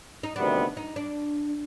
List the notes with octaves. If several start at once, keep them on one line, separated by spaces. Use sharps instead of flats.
D#4
D2 C3 D#3 G3 B3 D4
D#4
D4